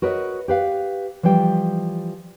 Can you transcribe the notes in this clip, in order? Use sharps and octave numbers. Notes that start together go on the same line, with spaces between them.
F#4 A#4 B4 C#5 D#5
G4 B4 F5
E3 F3 G3 G5